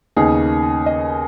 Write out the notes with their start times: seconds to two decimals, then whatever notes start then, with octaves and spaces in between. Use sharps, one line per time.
0.16 D#2 C#3 B3 D#4 G#4
0.86 D#5